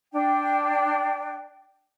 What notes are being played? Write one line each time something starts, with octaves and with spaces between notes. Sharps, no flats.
D4 G5